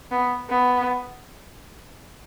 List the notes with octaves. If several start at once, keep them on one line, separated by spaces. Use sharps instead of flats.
B3
B3